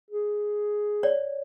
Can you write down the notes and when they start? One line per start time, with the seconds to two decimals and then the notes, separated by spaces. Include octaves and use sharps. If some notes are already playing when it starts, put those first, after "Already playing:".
0.11 G#4
1.03 C#5 D5